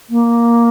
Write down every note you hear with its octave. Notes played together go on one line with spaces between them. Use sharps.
A#3